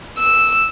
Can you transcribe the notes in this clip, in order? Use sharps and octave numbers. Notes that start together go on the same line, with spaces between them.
E6